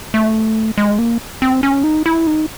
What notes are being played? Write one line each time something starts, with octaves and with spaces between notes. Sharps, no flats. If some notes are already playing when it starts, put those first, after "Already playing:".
A3
G#3
A#3
C4
C#4
D#4
E4
D#4